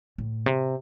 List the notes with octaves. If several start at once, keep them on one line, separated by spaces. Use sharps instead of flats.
A2
C3